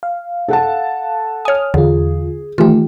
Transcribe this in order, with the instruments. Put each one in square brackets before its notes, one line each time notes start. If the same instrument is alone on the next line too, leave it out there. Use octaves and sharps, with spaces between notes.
[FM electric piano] F5
[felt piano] A4 F#5 A5
[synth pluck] C#5 G#5 [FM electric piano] D#6 F6
[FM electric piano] E2 F4 [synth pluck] D3 [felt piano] G#4
[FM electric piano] D#3 A3 G4 [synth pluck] E3 F4